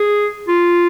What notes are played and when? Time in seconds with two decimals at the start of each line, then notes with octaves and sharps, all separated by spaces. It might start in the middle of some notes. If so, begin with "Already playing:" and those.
Already playing: G#4
0.48 F4